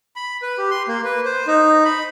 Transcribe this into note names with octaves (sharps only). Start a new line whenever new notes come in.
B5
B4
G4
C6
A#3
B4
C5
D#4
B5